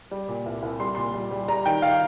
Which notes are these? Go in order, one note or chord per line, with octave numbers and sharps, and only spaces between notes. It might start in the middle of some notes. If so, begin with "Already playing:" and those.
G3
A#2
C2
C2
G3 C6
A#2 C6
G3
G3
G3 A#5
D#3 G5
F5